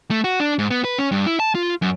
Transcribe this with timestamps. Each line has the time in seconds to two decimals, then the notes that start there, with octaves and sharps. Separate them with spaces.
0.11 A3
0.24 F#4
0.40 D4
0.59 G#2
0.71 B3
0.84 B4
0.99 C#4
1.12 G2
1.26 E4
1.40 A5
1.55 F4
1.82 F#2